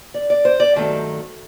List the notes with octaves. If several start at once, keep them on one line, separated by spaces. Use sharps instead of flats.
D5
D5
C5
D5
G2 D#3 F#3 A3 A5